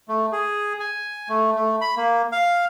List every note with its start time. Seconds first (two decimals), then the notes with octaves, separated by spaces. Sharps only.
0.08 A3
0.32 G#4
0.80 G#5
1.29 A3
1.55 A3
1.81 B5
1.97 A#3
2.32 F5